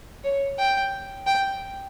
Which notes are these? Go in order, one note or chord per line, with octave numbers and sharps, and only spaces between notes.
C#5
G5
G5